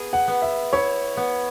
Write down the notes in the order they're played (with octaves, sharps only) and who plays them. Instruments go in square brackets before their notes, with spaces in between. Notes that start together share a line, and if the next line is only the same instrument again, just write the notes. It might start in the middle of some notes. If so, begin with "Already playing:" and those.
Already playing: [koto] B3 G#4
[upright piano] F#5
[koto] B3
[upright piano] E5
[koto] E4 [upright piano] C#5
[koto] B3